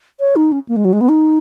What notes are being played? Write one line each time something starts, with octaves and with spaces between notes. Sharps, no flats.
C#5
D#4
C#4
A#3
G#3
F#3
G#3
B3
D#4